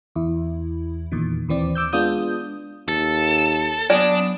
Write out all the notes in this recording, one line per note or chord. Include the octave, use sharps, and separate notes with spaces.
E2 E4
E2 A#2 D#3
D#2 E3 C4 D5
D6 E6 G6
G#3 B3 D4 F4 D#6 G6
D#2 A4
F#3 B3 D4 D5 G#5 D#6